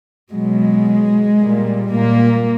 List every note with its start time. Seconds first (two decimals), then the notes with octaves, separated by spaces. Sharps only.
0.31 B2 F#3 G#3
1.40 A#2 G3
1.93 A#2 A#3